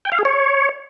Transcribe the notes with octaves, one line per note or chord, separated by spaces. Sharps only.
G5
F5
G#4
C#5